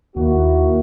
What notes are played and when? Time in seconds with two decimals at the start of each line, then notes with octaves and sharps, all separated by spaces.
0.16 D#2 A#3 E4 F#4